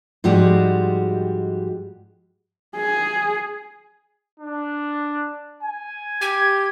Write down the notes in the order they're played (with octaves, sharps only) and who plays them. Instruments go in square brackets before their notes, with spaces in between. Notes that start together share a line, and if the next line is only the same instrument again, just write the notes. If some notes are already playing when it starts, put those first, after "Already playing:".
[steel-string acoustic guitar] G#2 F3 G3 G#3 F#4 G4
[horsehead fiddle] G#4
[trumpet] D4
G#5
[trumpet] G4 [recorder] G#6